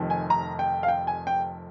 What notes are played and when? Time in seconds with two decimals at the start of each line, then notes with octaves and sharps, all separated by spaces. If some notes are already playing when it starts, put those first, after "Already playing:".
Already playing: F1 F2 C3 D#3
0.10 G#5
0.30 A#5
0.59 G5
0.83 F5
0.88 G5
1.07 G#5
1.27 G5